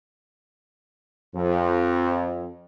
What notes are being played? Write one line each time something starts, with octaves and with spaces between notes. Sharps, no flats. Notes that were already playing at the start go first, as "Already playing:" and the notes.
F2